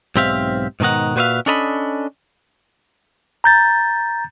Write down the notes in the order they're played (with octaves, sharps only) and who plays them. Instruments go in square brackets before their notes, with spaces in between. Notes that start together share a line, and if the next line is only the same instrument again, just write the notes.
[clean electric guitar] B1 G#2 C4 G4 E5 F5
G#2 B2 D#3 D#4 F#5
A#2 F#4 B4 C5 E5 F5
C#4 D4 A4 D#5 A#5 B5
[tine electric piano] A#5 G6 A6